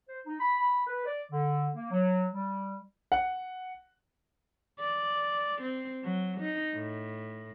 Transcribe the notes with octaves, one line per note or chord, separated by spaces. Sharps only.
C5
D#4
B5
B4
D5
D3
A#3
F#3
G3
F#5
D5
C4
F#3
D#4
A2